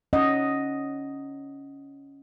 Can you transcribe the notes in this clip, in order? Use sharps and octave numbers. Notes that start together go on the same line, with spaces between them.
C#4 D#5 F#5